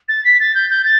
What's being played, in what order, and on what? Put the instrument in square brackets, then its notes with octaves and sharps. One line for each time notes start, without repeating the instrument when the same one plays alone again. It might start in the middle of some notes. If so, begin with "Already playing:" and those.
[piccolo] A6
B6
A6
G6
G6
A6